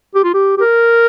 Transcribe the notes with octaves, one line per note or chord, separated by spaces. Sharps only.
G4
F4
G4
G4
A#4